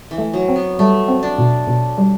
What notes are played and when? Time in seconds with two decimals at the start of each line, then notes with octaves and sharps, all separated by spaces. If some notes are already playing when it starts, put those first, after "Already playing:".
0.11 E3
0.18 A3
0.34 F#3
0.48 C4
0.56 B3
0.79 G3 A3
1.08 C4
1.23 D4
1.38 B2
1.68 B2
1.98 G3